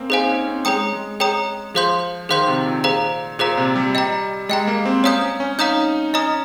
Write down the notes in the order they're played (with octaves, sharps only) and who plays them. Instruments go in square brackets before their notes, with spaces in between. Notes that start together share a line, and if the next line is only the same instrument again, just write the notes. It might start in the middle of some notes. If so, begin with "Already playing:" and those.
Already playing: [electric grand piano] A#3 C4 C#4
[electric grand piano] D#4 [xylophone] G#4 C5 F5 G#5
[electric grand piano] C#4
C4
[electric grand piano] G#3 [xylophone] G#4 C#5 G5 A#5 D#6
[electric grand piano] G#3
[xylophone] G#4 C#5 G5 A#5 D#6
[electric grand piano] F3 [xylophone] G#4 C5 F5 C6 G6
[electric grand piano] D#3 [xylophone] G#4 C5 F5 C6 G6
[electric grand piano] C3
A#2
[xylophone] G#4 C5 F5 A#5
[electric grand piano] A#2 [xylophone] G#4 C5 F5 A#5
[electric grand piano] C3
G3
[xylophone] D#5 G5 A#5
[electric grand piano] G#3 [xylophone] D#5 G5 A#5
[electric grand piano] A#3
C4
[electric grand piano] C#4 [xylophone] C#5 F5 A#5 D#6 G6
[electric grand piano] C#4
C#4
[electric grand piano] D#4 [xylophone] C#5 F5 A#5 D#6 G6
[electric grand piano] C#4 [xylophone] D#5 A#5 D#6